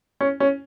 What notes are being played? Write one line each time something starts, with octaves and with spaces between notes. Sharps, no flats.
C#4
C#4